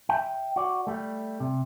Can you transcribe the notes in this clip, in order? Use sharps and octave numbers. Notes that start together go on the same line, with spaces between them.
E5 G5
F#4 D5
G3 A3
C3